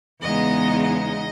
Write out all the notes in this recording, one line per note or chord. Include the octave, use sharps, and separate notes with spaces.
E2 C#3 G#3 B3 D#4 D#5
D#5